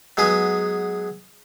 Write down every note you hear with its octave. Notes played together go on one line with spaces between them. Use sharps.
F#3 G#3 B3 G#4